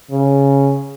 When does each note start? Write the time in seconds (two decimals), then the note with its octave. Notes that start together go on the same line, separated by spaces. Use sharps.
0.11 C#3